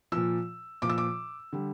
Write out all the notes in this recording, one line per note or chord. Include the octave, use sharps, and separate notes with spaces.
A#2 F3 E6
A#2 F3 D6
E6
D6
D3 G3